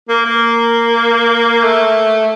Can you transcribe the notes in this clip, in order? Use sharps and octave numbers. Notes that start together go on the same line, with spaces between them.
A#3
A#3
A3